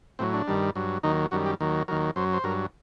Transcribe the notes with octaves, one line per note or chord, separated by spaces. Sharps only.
A2 F#3 C4
D4
G2 D#3 G3
G2 F#3
D#2 D#3 F#3 D#4
F#2 D#3 G3 F#4
G4
D#2 D#3 F#3
D#2 D#3 F#3 A#4
F#2 F#3 C5
C5
G2 F#3 A#4